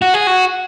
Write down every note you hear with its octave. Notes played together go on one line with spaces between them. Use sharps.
F#4
G#4
F#4